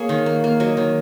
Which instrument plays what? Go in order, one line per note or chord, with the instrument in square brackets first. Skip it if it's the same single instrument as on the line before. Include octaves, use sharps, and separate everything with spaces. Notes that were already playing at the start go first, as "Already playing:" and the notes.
Already playing: [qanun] A#3 G#4 C#5
D#3
A#3
A#3
F#3 D#5
D#3